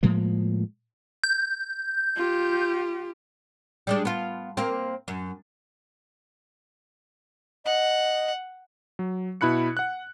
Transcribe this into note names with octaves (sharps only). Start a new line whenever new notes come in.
A2 F3 G#3 A#3
G6
F4 G4
G3 G#3 D4
B3 F4
A#3 C4
F#2
D#5 F#5
F#3
B2 E4 B5 F#6 C#7
F#5 F#6